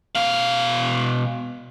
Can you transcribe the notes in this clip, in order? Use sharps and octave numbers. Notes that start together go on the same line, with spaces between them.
B2 F5